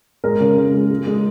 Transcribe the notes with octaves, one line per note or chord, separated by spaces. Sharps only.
G#3 A#4
C#3
G#3
G#3
G#3
G#3